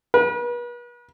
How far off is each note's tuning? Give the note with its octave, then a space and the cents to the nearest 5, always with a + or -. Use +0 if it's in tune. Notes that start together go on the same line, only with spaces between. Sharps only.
B4 -40